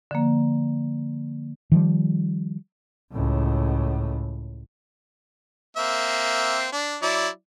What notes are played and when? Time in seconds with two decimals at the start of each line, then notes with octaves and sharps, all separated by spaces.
0.11 D3 F3 A#3
1.72 D#3 F3 G3
3.12 C#2 A2
5.77 A#3 C4 E5
6.72 D4
7.02 F#3 E4 D5